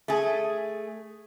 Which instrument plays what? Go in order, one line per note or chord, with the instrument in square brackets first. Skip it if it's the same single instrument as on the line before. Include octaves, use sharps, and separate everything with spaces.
[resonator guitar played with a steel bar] A3 G#4